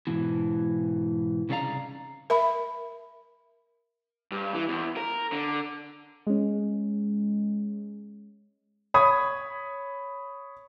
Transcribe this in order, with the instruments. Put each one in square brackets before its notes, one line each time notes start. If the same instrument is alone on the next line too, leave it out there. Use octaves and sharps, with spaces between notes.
[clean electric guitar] G#2 B2 E3
C2 C#3 D#4 D5 F5 A#5
[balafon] A#4 E5 B5
[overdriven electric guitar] G2
E3
E2
A#4
D3
[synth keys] G#3 C#4
[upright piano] C#5 B5 D#6 G#6